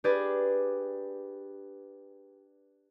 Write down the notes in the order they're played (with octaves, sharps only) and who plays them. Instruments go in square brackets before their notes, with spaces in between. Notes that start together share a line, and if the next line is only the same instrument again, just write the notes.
[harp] D4 G4 G#4 B4 D5